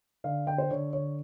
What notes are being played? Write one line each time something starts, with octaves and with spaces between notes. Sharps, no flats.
D3 F5
D3 G5
C5
D3 C#5
D3 C#5